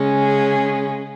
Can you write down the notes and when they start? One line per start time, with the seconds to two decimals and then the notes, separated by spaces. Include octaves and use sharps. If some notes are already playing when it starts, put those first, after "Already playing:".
Already playing: C#3 G#3 C#4
0.21 G#4